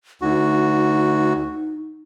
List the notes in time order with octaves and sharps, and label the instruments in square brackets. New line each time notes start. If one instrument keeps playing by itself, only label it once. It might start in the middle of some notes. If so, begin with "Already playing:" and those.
[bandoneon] D2 F#4 [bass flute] D#4